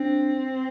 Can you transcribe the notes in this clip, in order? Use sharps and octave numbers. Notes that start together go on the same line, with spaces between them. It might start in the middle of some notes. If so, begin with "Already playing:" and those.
Already playing: C4 D4